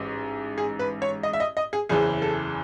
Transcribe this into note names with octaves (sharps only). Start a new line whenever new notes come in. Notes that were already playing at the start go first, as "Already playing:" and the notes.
Already playing: A1 G#2
G#4
B4
C#5
D#5
E5
D#5
D#5
G#4
F#1 E2 C#3 E3 G#4
A4